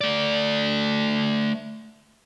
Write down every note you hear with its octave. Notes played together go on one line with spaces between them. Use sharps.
A3 D5